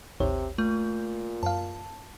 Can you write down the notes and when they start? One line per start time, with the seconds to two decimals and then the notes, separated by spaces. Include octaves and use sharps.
0.20 A1 D#2 C3 C#5
0.58 A#2 A3
1.43 F#2 F5 A5